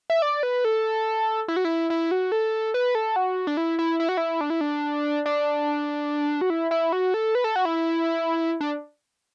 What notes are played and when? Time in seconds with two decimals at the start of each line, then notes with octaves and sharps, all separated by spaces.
0.10 E5
0.22 D5
0.43 B4
0.65 A4
1.48 E4
1.56 F#4
1.65 E4
1.90 E4
2.11 F#4
2.32 A4
2.74 B4
2.95 A4
3.16 F#4
3.47 D4
3.57 E4
3.79 E4
4.00 E4
4.09 F#4
4.17 E4
4.41 D4
4.50 E4
4.61 D4
5.26 D4
6.41 F#4
6.50 E4
6.71 E4
6.92 F#4
7.14 A4
7.35 B4
7.44 A4
7.56 F#4
7.65 E4
8.61 D4